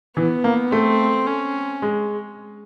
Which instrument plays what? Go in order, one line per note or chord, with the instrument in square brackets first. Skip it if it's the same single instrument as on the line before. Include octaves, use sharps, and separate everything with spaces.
[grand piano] E3 [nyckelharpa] B3
[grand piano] A#3
[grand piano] A3 [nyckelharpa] C4
[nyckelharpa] C#4
[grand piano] G#3